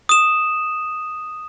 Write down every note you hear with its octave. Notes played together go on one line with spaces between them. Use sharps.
D#6 E7